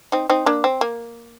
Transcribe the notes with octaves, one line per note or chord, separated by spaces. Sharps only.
C4 D#4
C4 D#4
A#3 D4
C4
A#3